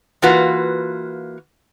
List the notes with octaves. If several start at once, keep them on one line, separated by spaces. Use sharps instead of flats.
E3 A#3 F4 F#4 B4